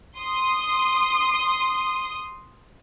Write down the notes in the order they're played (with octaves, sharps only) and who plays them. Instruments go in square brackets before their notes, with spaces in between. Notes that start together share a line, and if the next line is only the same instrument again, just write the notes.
[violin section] C6 D#6